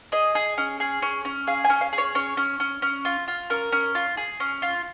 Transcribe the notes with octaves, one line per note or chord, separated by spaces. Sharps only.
G#4 D#5
G#4
C#4
G#4
C#4
C#4
G#4 F5
G#5
C#4
F5
G#4
C#5
C#4 C#5
C#4
C#4
C#4
F4
F4
C#4 A#4
C#4
F4
G#4
C#4
F4